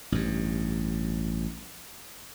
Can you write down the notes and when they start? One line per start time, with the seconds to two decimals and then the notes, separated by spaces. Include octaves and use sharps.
0.12 A1 G2